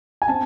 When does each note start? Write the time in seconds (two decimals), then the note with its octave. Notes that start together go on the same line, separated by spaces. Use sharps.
0.22 G#5
0.28 C4 A5